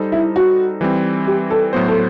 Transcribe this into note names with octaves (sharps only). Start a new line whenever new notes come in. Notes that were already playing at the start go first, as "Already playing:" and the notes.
Already playing: G3 D#4 A4 C5
E4
F#4
E3 G3 C4
G4
A4
A2 F#3 B3 F#4 C5
A4